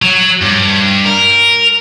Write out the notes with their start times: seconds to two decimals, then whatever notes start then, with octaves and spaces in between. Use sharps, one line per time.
0.02 F#3
0.42 G2
1.05 A#4